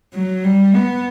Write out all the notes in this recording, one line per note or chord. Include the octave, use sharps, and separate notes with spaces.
F#3
G3
B3